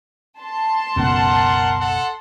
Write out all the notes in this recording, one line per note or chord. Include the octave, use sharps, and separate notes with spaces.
A5 C6
F#1 C#2 B2 A#4 F#5
A4 F#5